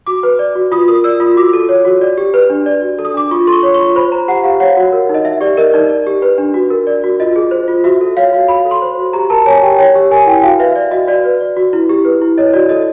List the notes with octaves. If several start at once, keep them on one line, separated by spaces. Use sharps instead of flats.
F#4 D6
B4
D5
F#4
F4 D#6
A#4 D#6
D5 E6
F4 D#6
F#4 D6
A4
C#5
F#4
D5
G4
B4
D4
D5
F#4
A4
D#6
D4 D6
F4 C#6
A4 C6
C#6
C#5
F4 C#6
C5 B5
C5 A#5
G4 F#5
G4 F5
C#5 F#5
F#4
A#4
D#4
D#5
D#4 E5
G4 D5
A#4 D#5
D#4 D5
D5
G4
B4
D4
F#4
A#4
D5
F#4
F4 D#5
G#4
C5
F4
F#4 E5
A4
C#5 F5
F#4
F#4 B5
A4
C6
C5
F#4
G4 A#5
A#4 A5
C#5 G#5
G4 G5
C#5
G4
A#4 G#5
E4 G5
F#4 F5
B4 E5
D5
F#4 D#5
F#4 D5
B4
D5
F#4
E4
G4
B4
E4
C#5 D#5
F#4 D5
A4 D#5